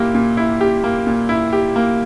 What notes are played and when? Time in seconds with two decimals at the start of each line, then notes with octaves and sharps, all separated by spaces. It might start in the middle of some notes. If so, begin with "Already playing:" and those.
Already playing: A#2 A#3 E4 G4
0.14 A#2
0.37 E4
0.61 G4
0.84 A#3
1.07 A#2
1.29 E4
1.53 G4
1.76 A#3